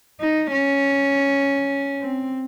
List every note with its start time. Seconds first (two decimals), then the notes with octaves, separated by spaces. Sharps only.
0.21 D#4
0.51 C#4
2.01 C4